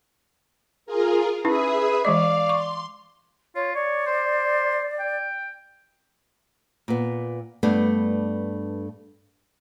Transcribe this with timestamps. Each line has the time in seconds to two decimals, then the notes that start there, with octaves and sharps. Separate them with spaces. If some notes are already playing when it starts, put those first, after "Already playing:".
0.86 F4 G#4 A#4
1.45 C#4 D#4 E4 G#4 B4 E5 D#6
2.05 E3 G#3 D5 D#5 F5
2.49 C6 C#6
3.56 F4 C#5
3.75 C#5 D5
4.06 C5
4.99 G5
6.88 A#2 B3
7.63 G2 A3 B3 D4